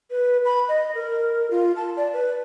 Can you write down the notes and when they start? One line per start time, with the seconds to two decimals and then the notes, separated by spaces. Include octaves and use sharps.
0.11 B4
0.45 B5
0.69 D#5
0.95 A#4
1.51 F4
1.76 A5
1.97 D5
2.13 B4